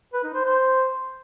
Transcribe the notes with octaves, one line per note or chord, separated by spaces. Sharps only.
B4
D#4
C5
C5